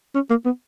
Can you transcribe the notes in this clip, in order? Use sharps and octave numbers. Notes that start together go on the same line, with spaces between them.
C#4
A#3
B3